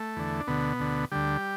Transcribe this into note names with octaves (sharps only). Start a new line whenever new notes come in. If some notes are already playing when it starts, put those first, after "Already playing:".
Already playing: A3
E2 D3
D4
D2 B2 D3 B3
D2 D3
D2 D3 G3 G4